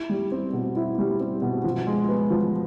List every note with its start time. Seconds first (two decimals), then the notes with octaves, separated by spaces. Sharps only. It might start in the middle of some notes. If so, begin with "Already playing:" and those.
Already playing: E4
0.09 G3
0.32 C4
0.53 B2
0.76 E4
0.98 G3
1.20 C4
1.42 B2
1.64 F3
1.87 G#3
2.09 B3
2.30 F3